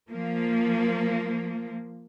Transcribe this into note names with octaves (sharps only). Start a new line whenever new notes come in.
F3 A#3